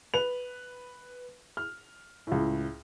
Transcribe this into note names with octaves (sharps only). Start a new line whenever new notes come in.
B4 F7
F6
C#2 A2